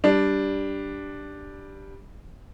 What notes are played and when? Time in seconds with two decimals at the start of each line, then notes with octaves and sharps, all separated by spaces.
0.04 G3 D4